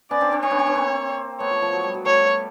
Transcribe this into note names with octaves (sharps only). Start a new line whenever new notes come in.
B3 C#4 D5
C4 D4
C4 D4
C4 D4 C#5
B3 C#4
C4 D4
B3 C#4
A#3 C4
A3 B3 C#5
F3
F3
F#3
G3
F#3
G3 A3 C#5